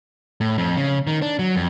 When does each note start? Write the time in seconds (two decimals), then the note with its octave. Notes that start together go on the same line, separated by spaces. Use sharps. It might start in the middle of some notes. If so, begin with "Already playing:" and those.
0.41 A2
0.58 F2
0.77 C#3
1.07 D#3
1.22 D4
1.39 F#3
1.56 F2